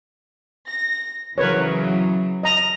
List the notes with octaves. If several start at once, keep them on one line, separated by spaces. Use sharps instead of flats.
A#6
C#3 E3 F#3 A#4 B4 C#5
D#5 A#5